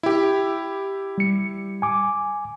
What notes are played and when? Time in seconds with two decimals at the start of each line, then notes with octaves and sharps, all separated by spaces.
0.03 E4 G4
1.18 G3 C#7
1.82 G#5 D6